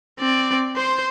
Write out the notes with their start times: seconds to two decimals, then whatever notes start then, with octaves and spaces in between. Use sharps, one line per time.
0.20 C4 D5
0.76 C5 C6